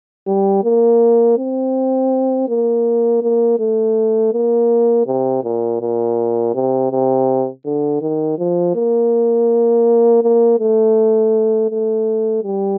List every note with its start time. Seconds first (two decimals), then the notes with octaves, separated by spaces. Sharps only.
0.27 G3
0.64 A#3
1.38 C4
2.49 A#3
3.22 A#3
3.59 A3
4.33 A#3
5.07 C3
5.44 A#2
5.81 A#2
6.55 C3
6.92 C3
7.65 D3
8.02 D#3
8.39 F3
8.75 A#3
10.23 A#3
10.60 A3
11.71 A3
12.44 G3